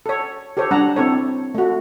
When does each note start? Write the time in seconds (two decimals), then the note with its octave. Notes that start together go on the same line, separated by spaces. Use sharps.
0.06 A4 C#5
0.57 G4 A4 C5 C#5
0.71 G3 D4 F#5 A5 A#5
0.96 C4 E4 A4 C#5
1.55 A3 F#4